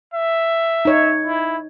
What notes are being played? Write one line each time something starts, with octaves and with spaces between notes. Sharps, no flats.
E5
D#4 C#5
E4